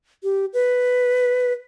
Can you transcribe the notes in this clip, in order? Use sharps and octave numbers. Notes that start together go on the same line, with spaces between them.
G4
B4